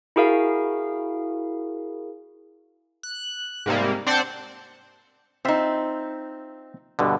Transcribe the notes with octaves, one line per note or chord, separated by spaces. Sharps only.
E4 F#4 G#4 A#4 F5
F#6
G#2 C3 G3 A#3
C4 D4 C5 D5 F#5
C4 D#4 F4 C5 E5
G2 B2 D3